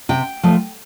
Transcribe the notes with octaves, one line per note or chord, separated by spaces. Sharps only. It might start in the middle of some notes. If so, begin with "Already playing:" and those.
C3 G5
F3 A3